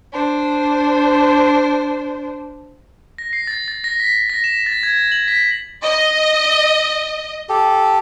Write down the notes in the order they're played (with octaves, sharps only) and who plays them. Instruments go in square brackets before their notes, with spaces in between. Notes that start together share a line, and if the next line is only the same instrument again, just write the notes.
[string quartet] D4 C5
[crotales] A#6
C7
A6
A6
A#6
B6
A#6
E7
A6
G#6
F#7
B6
[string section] D#5
[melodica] G4 A4